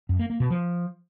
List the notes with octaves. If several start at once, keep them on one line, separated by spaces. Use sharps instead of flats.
F#2
A#3
A#3
B2
F3